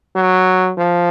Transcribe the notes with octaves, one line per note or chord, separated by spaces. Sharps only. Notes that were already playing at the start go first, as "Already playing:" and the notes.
F#3
F3